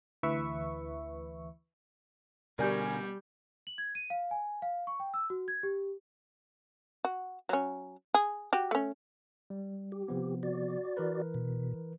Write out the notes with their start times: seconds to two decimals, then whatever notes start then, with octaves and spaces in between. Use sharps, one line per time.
0.23 D2 E3 B4 E5 C#6
2.59 B2 D3 G3 G4 A#4 D5 G#5 G6
3.67 F#7
3.78 G#6
3.95 D#7
4.10 F5
4.31 G#5
4.62 F5
4.87 C#6
5.00 G5
5.14 E6
5.30 F#4
5.48 G#6
5.63 G4
7.05 F#4
7.49 F#3 C#4
8.14 G#4
8.53 F#4 G4
8.71 A3 C#4
9.50 G3
9.92 G4
10.08 C3 F3 B3
10.43 F#4 D5
10.97 E3 A#4 B4
11.34 B2